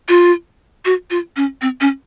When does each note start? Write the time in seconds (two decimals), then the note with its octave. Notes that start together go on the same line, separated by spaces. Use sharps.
0.09 F4
0.85 F#4
1.10 F4
1.37 C#4
1.62 C4
1.81 C#4